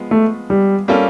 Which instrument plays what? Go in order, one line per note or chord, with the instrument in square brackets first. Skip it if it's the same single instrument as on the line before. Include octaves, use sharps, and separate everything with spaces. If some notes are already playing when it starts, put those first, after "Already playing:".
Already playing: [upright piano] F3 G#3 B3
[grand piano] A3
G3
[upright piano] G3 A#3 C#4 F4 A4